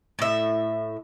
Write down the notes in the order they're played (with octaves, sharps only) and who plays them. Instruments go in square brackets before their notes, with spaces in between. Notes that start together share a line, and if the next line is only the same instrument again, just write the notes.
[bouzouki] A2 E5